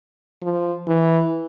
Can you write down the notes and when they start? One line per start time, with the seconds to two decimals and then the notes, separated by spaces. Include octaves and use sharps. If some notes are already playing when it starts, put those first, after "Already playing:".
0.43 F3
0.88 E3